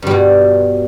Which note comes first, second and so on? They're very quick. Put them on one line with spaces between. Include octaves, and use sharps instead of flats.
G2 G3 B2